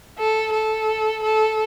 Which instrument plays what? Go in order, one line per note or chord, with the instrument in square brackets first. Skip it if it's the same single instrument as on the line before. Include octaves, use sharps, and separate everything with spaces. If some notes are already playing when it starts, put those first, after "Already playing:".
[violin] A4
A4
A4